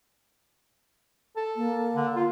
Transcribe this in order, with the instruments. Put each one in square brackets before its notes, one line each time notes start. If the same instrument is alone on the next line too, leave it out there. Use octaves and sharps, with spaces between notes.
[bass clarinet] A4
[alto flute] A#3
[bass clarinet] D3
F4